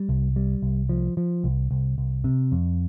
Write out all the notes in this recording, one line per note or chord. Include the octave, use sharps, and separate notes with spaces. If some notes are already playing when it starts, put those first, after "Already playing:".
Already playing: G3
C2
G3
C2
F3
F3
C2
C2
C2
C3
F2